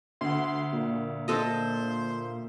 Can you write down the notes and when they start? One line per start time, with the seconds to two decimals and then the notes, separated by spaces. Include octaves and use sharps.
0.21 D2 F#5 C6
0.73 A#2
1.28 D4 A4 C5 D#5